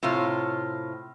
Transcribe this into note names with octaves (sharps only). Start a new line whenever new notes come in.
A2 C3 F4 C#5